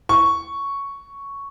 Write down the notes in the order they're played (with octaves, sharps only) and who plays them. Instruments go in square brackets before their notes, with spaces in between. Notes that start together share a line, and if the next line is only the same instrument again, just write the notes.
[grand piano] C#6